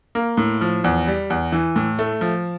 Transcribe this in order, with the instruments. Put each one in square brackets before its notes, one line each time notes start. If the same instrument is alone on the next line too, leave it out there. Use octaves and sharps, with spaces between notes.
[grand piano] A#3
A2
F3
E2
G3
E2
E3
A2
A3
F3